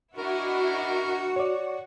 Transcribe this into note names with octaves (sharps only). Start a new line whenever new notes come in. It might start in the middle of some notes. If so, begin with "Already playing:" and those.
D4 E4 F#4 A#4 D#5
C#5 D5